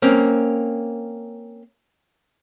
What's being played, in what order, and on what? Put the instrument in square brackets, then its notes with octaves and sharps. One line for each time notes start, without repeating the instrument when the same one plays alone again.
[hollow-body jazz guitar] A#3 C4 C#4